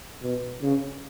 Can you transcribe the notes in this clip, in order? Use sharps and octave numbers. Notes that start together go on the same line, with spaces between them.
B2
C#3